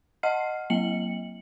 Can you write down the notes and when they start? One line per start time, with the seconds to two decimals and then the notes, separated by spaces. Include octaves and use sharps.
0.23 D#5 F#5 F6 C7
0.70 F#3 A#3 C#7 F#7